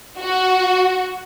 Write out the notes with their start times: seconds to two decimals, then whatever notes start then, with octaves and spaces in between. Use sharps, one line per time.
0.19 F#4